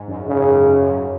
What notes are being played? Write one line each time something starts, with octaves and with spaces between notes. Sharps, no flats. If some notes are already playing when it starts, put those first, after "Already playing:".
Already playing: G#2
F#2
C#3
F#2
F#2